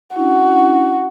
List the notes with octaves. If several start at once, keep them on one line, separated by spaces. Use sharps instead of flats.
C#4 D4 E4 F#4